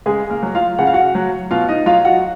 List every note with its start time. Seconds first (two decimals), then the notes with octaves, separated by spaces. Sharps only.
0.06 C#3 G#3 G#4
0.30 A#3 A#4
0.43 F#3
0.55 F4 F5
0.79 C#3 F#5
0.87 F5
0.94 F#4 F#5
1.15 F#3
1.51 B2 F4 F5
1.69 D#4 D#5
1.86 F#3 F4 F5
2.05 F#4 F#5